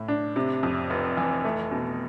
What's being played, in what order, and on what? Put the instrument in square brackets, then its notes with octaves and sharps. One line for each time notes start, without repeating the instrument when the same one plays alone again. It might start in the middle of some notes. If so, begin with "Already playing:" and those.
Already playing: [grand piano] A2
D4
C3
F2
F1
E3
A3
B2